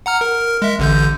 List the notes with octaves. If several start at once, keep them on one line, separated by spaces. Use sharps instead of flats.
F#5 A#5 F6
A#4
A#4
G#3 E5
A1 D3 G6